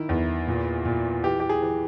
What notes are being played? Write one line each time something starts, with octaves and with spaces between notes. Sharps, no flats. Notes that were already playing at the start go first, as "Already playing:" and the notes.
Already playing: D#3 E4
E2
A#2
A#2
E3 G4
G4
G#4
E3